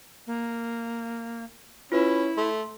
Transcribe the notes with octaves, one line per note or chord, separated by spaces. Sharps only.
A#3
C#4 E4 F4 B4 B5
A3 C6